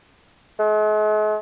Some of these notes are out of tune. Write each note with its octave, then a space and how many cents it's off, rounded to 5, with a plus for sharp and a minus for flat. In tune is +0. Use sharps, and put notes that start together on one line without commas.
G#3 +45